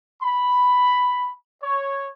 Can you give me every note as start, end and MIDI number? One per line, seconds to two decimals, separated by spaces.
0.22 1.32 83
1.61 2.06 73